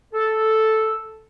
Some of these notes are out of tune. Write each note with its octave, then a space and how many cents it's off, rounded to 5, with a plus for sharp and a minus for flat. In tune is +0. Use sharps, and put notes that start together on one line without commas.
A4 -5